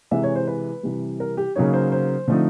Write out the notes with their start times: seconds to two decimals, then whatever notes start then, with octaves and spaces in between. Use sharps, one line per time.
0.11 C3 E3 G#3 E5
0.23 C#5
0.36 C5
0.48 B4
0.83 C3 E3 G3
1.20 A#4
1.37 G4
1.55 C#3 F#3 A#3 D#4 C#5
1.73 C5
1.92 C5
2.28 D3 F3 A3 C4 D#4